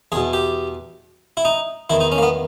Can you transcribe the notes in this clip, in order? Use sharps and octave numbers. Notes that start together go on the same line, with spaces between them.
E2 B2 G#4
G4
E4
D#4
E2 D#3 E4
D#4
C#4
A#3
B3